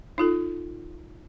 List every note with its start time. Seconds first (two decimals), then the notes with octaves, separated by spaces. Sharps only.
0.18 D#4 F4 A4